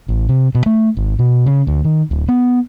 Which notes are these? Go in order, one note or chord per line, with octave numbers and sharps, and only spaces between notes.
A1
C3
B2
A3
G#1
B2
C#3
D2
D#3
D1
B3